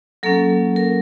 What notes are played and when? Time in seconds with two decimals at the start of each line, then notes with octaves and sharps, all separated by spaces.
0.23 F#3 A#3 C#4 A4
0.76 A#4